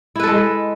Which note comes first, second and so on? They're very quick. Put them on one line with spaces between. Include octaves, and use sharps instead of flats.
E4 B4 A4 G#3